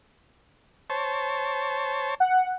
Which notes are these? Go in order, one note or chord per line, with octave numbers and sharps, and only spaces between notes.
C5 C#5 A5
F#5